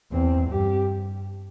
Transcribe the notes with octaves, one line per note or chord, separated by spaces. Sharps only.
E2 C4
G2 G4